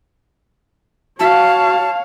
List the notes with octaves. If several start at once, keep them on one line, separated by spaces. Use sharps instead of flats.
F#4 C#5 F5 A5